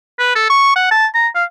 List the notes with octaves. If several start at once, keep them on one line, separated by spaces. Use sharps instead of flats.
B4
A4
C#6
F#5
A5
A#5
F5